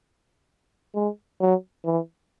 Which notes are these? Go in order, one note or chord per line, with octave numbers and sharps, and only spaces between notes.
G#3
F#3
E3